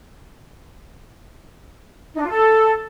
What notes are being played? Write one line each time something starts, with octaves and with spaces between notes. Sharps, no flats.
D#4
D4
F4
A4